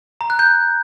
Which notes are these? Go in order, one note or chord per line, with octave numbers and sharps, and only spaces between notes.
A#5
F#6
G6